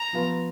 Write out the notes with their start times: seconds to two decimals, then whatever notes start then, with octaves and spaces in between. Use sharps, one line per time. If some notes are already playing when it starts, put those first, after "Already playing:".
Already playing: A#5
0.13 F3 B3 F4